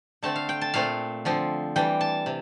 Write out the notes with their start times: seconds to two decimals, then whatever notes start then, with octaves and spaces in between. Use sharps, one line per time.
0.22 D3 A3 C4 A5
0.36 F5
0.49 G5
0.61 A5
0.74 A#2 A3 C4 F5
1.25 D3 F3 C4
1.76 E3 G3 D4 G5
2.01 A5
2.26 C3